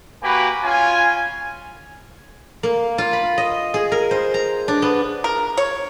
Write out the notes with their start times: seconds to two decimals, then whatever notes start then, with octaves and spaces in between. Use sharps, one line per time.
0.23 A#3 F#4 G4 B4 G#5 B5
0.64 C#4 F4 F5 G#5
2.63 A#3
2.98 F4
3.13 B5
3.38 D#5
3.74 G#4
3.92 A#4
4.11 C5
4.34 A#5
4.68 D4
4.82 B3
5.24 A#4
5.57 C#5